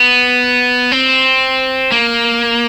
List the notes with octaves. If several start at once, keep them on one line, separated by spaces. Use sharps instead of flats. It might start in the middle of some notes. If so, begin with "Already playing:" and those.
Already playing: B3
C4
A#3